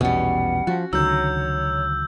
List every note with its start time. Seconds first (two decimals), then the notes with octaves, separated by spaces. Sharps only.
0.01 A#1 E2 B2 G3 C#4 F#5
0.67 F3 F#4
0.93 C#2 D3 D#3 F#3 C#5 E6 G6